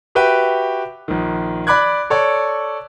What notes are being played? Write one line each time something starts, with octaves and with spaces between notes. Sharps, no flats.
F#4 G4 B4 E5 G5
A#1 D#3
D5 B5 D6 F#6 G#6
A4 C#5 D5